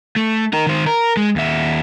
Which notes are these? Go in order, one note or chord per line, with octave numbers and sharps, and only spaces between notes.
A3
D#4 A#4
D#3 C5
A#4
G#3
D#2 E5